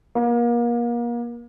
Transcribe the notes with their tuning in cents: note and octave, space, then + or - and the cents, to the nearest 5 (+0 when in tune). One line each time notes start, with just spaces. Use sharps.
A#3 +35